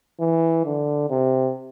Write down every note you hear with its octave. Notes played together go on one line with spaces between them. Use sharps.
E3
D3
C3